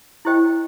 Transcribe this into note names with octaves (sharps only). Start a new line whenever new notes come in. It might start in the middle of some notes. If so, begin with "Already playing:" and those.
E4 G4 C5 D#5 G5